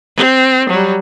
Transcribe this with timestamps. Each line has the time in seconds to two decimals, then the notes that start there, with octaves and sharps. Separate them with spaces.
0.17 C4
0.69 F#3 G3